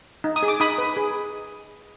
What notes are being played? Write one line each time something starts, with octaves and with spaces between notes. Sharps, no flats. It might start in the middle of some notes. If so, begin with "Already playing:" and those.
D#4
D#6
G#4
D6
D#4 B5 D#6
B4
G#4